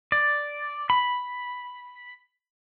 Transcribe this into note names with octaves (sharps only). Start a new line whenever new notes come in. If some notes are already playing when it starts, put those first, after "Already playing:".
D5
B5